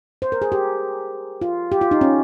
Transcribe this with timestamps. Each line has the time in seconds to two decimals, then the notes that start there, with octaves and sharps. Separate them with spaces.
0.22 C5
0.32 A#4
0.42 G#4
0.52 G4
1.42 F4
1.72 G4
1.81 F4
1.91 D#4
2.01 C#4